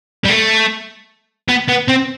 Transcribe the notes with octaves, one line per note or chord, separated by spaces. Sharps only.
G3
A3
B3
B3
C4